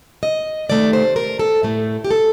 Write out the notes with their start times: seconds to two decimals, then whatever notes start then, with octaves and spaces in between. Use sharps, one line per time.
0.23 D#5
0.69 C3 D#3 A3 D5
0.93 C5
1.16 A#4
1.39 A4
1.63 A2 A3
2.04 G4
2.11 A4